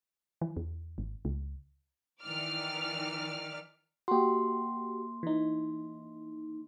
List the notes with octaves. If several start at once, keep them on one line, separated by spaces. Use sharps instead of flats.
E3
E2
G#1
C#2
D#3 E3 D5 F6
A#3 F#4 G4 C6
E3 D#4